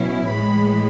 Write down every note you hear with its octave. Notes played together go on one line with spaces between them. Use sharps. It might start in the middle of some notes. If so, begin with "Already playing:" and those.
Already playing: B2 F#3 C#4 E4
A2 E3 G#3 B5